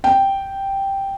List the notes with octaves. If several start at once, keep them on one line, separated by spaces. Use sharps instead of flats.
G5